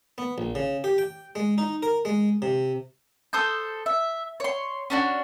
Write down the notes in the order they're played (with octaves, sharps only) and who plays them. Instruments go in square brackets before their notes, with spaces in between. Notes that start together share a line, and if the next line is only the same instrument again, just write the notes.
[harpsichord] B3
A#1
C#3
G4
G5
G#3
D#4
A#4
G#3
C3
[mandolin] A4 C5 D#6 G6
E5
C#5 C6
C#4 D4 F#4